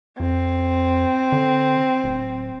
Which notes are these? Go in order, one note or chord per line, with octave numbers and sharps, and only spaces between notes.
F2 C4
D3
D1